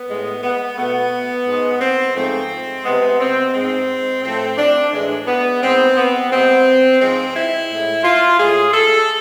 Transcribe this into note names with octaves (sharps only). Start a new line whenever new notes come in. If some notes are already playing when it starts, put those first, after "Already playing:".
Already playing: B3
A2 G#3
B3
B2 A3 B3
G#2 G#3
C4
G#2 F3 A3 C4
C3 G#3 B3
C4
G#2 G#3 C4
A2 F3 A3 C4
D4
A2 E3 G#3
B3
G#2 G#3 C4
B3
C3 G#3 C4
G#2 F3 G#3 C4
E4
A2 G#3
F4
A2 G#3 G#4
A4